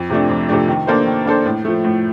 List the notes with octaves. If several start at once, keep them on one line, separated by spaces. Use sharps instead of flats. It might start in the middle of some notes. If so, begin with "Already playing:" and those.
Already playing: F2
C3 F3 A3 D4
F2
C3 F3 A3 D4
D#3
A#3 D4 A4 C5
D#3
A#3 D4 A4 C5
A2
F3 A3
A2